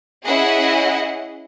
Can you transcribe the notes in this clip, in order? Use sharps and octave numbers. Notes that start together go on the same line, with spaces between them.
C#4 E4 G#4 D#5 F#5